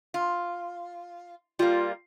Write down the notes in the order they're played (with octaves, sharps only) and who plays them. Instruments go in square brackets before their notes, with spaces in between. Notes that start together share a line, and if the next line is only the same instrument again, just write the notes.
[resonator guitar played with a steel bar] F4
[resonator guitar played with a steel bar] G3 A#3 [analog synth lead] F4